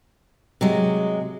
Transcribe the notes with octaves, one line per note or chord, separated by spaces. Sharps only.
C3 F#3 G#3